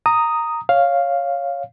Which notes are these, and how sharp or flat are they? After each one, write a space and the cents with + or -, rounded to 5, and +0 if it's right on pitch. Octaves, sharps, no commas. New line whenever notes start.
A#5 -10 D#6 +0
C#5 +0 F5 +0